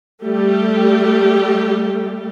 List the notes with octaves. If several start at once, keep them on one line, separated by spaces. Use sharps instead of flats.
G3 A3 G4